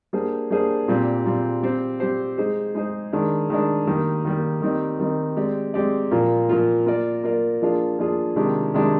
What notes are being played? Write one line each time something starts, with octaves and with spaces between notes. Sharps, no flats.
G3 A#3 D4 G#4 C5
G3 A#3 D4 G#4 C5
A#2 G3 C4
A#2 G3 C4
G3 C4 G4 C5
G3 C4 G4 C5
G#3 D#4 G#4 C5
G#3 D#4 G#4 C5
D#3 G#3 D4
D#3 G#3 D4
D#3 G3 A#3
D#3 G3 A#3
D#3 G3 C4 D#4
D#3 G3 C4 D#4
G#3 C4 G4 D5
G#3 C4 G4 D5
A#2 F3 A#3 F4
A#2 F3 A#3 F4
A#3 F4 A#4 D5
A#3 F4 A#4 D5
F3 A#3 D4 F4 G#4
F3 A#3 D4 F4 G#4
C3 D#3 G#3 D4 G4
C3 D#3 G#3 D4 G4